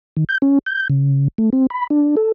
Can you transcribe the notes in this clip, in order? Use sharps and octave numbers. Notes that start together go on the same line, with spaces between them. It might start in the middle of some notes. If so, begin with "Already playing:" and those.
D#3
G6
C#4
G6
C#3
A3
C4
B5
D4
A4